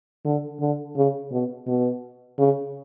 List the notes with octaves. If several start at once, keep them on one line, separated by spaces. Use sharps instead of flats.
D3
D3
C#3
B2
B2
C#3